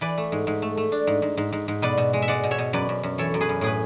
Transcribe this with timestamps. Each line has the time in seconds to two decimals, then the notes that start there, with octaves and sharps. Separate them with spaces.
0.01 E3 B4 D5
0.18 A3
0.32 G#2
0.47 G#2
0.62 A3
0.77 A3
0.92 D4
1.07 G#2
1.22 G#2
1.37 G#2
1.52 G#2
1.68 G#2
1.82 B2 B4 D5
1.98 B2
2.13 G#3
2.22 E5
2.28 G#3 D5 F#5
2.43 B2
2.51 C#5 E5
2.58 B2
2.73 F#2 B4 D5
2.89 F#2
3.03 F#2
3.18 E3 A4 C#5
3.34 F#2
3.41 G#4 B4
3.49 F#2
3.61 A2 G#4 B4